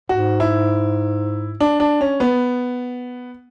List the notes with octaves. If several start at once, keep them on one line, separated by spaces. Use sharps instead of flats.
G#2 F#4
E4
D4
D4
C#4
B3